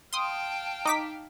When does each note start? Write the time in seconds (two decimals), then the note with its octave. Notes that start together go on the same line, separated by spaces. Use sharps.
0.13 F5 G5 A5 C6 D#6
0.86 D#4 D6 B6